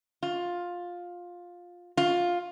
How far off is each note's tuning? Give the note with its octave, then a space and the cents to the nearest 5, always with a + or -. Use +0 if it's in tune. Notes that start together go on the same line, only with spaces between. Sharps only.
F4 +10
F4 +10